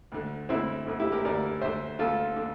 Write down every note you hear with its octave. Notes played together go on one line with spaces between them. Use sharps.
D2 D3
D2 D3 C4 E4
D2 D3
E4 G4
G4 A#4
D2 D3 A#4 D5
D2 D3 C5 E5
D2 D3 F4 A4
D3